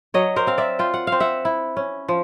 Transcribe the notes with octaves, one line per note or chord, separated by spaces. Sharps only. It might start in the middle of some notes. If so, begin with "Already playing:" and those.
F#3 C#5 D#5
A#4 C5
C4 F5
D5 E5
F4 G5
F#5
C4 F5
E5 F#5
E4
C#4
F3